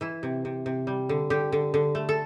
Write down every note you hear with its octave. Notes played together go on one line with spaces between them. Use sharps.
E3 E4
C3
C3
C3
G3
D3
D3 G4
D3
D3
A3
A4